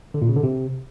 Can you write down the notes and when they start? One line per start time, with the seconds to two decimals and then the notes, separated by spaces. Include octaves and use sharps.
0.14 D3
0.22 A#2
0.29 C#3
0.36 D3
0.43 C3